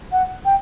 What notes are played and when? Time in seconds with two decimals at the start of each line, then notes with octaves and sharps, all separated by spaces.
0.12 F#5
0.45 G5